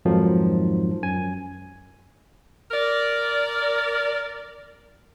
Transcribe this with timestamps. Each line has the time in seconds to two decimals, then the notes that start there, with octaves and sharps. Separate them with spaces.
0.05 F2 G#2 D#3 F3 F#3
1.03 F#2 G#5
2.71 A#4 D5